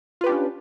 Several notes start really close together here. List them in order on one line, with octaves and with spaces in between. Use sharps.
F4 B4 G4 D4 C#4